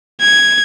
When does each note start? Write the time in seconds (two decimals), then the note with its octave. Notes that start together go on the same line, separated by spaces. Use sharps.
0.21 G#6